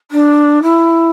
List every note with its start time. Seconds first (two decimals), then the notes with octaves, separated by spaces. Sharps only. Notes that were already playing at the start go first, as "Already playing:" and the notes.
0.11 D4
0.62 E4